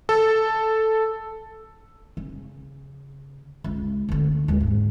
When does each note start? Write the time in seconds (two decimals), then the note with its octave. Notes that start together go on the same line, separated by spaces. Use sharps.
0.09 A4
2.17 C#3
3.64 C#2
4.09 D2 D3
4.48 D#2 G#3
4.61 G#2